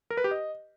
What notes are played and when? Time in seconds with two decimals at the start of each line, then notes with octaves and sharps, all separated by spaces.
0.10 A#4
0.17 B4
0.24 G4
0.31 D#5